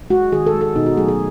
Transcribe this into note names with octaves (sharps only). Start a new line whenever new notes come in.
G#3 F#4
D#3 G#4
A4
G#3
A4
B2 D#4
F#4
F#3 A3 G#4
G#4